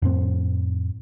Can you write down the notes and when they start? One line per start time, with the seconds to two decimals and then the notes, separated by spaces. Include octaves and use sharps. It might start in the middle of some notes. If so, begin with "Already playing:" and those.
0.02 F2 A2 C4